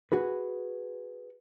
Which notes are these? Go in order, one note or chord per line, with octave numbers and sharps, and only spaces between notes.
F#4 G#4 B4